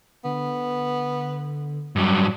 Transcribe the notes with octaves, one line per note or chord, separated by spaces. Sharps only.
D3 B3
G2 F#3 G3